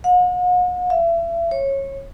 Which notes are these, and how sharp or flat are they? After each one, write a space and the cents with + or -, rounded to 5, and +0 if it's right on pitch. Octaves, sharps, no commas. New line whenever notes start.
F#5 -45
E5 +35
C#5 -20